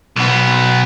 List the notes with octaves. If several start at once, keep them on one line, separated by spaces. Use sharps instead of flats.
B1 B3